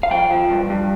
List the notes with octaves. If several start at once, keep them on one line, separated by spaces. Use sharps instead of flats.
F5
F3 G5
F3
G2
G2